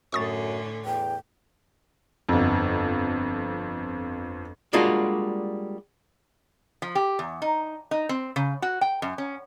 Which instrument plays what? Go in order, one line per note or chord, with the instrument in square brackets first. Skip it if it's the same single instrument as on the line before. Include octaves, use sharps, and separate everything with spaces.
[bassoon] F#2 [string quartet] A2 D3 C#4 [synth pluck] C#6 D#6 A6
[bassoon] E2 [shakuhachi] G5
[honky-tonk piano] G1 F2
[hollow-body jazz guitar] G3 G#3 A#3 D4 F4 F#4
[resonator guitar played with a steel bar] F3
G4
E2
D#4
D#4
C4
C#3
F#4
G5
F#2
C#4